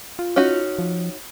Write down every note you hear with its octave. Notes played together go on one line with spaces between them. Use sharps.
F4
C#4 D#4 F#4
F3